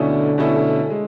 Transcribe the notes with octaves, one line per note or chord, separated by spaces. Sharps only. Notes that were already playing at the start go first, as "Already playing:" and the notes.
Already playing: B2 D3 A3 C#4 E4 A4
B2 A3 C#4 E4 A4
G#3